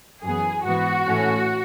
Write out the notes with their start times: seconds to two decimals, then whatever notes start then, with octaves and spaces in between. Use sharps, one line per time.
0.23 F#2 E3 B3 G#4
0.65 G#2 E3 B3 F#4
1.08 A2 E3 A3 C#4